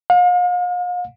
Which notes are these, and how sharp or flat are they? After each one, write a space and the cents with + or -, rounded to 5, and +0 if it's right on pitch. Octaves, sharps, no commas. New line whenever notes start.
F5 +40